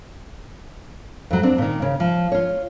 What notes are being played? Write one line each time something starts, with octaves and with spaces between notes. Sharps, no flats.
F2 F#3
C4 D4
A#2 D#3
C#3
F3
F4 C#5